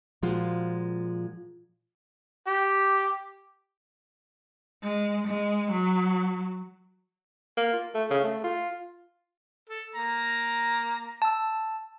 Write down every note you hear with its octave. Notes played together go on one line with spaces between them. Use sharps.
A#2 F3 G#3 F4 F#4
G4
G#3
G#3
F#3
A#3
F4
A3
C#3
A3
F4
A4
A#3 A#5
A5 E6